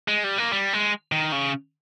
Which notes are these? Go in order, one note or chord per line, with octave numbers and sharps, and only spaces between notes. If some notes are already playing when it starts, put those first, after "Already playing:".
G#3
G3
A#3
G3
G#3
D#3
C#3